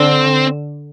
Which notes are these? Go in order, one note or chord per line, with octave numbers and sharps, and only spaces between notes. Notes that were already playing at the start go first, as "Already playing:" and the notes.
Already playing: D3 C4